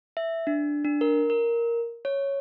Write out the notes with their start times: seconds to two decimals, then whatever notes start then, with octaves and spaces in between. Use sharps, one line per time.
0.17 E5
0.47 D4
0.85 D4
1.01 A#4
1.30 A#4
2.05 C#5